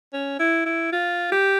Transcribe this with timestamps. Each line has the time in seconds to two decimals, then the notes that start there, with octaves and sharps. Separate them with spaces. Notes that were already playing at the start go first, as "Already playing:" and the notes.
0.13 C#4
0.39 E4
0.66 E4
0.92 F4
1.32 G4